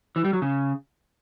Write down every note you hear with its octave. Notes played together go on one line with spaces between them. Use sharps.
E3
G3
F#3
C#3